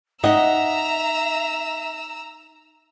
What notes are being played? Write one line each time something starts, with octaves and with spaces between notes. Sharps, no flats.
D#4 D#5 E5 F#5 A#5 E6